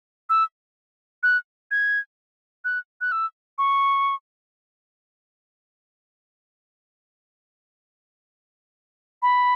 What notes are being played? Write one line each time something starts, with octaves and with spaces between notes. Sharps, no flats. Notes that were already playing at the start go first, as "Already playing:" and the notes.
E6
F#6
G#6
F#6
F#6
E6
C#6
B5